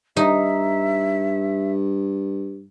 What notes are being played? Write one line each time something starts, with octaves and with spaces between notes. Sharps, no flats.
G2 D#4 E5